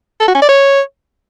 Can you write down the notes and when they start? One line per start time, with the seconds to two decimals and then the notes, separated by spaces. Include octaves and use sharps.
0.20 A4
0.28 F#4
0.35 C#4
0.42 D5
0.49 C#5